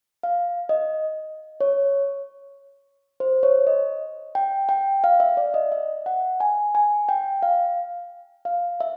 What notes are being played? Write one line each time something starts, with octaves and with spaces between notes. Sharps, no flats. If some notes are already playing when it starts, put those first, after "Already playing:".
F5
D#5
C#5
C5
C#5
D#5
G5
G5
F5
E5
D5
D#5
E5
F#5
G#5
G#5
G5
F5
F5
E5